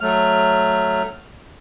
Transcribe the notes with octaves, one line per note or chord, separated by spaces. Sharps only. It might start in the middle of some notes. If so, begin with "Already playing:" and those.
F#3 A3 F6